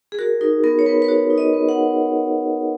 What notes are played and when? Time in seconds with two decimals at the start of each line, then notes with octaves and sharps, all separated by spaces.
0.12 G#4
0.19 F#4 A#4
0.41 D#4 A#4
0.64 B3 A#4
0.79 C#5
0.86 B3 B4
1.02 B4
1.08 F#4 C#5
1.30 D#4
1.38 D#5
1.54 B3
1.69 F#5